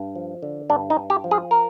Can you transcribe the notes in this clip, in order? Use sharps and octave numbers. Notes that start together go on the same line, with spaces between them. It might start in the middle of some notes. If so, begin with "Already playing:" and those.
Already playing: G2
F3
D3
G2 D4
D#4
G2
G4
F3
G#4
A#4